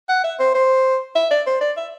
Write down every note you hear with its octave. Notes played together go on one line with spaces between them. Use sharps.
F#5
E5
C5
C5
E5
D5
C5
D5
E5